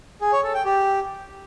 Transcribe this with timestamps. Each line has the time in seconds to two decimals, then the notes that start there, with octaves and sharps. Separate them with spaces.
0.21 G#4
0.32 C#5
0.43 A4
0.54 G5
0.65 G4